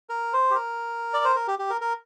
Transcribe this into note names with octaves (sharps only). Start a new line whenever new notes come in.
A#4
C5
G4
A#4
D5
C5
A#4
G4
G4
A#4
A#4